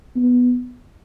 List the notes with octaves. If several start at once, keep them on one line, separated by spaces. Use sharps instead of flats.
B3